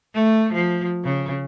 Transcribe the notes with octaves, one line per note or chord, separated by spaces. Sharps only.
A3
F3
C#3